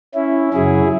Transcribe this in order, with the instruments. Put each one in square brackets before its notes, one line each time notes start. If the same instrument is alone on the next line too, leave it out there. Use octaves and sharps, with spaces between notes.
[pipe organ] C#4 E4
F#2 C#3 F#3 E4 G#4